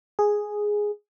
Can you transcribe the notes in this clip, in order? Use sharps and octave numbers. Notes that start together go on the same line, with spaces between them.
G#4